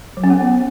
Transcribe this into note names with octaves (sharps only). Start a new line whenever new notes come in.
F#3
C#4
B3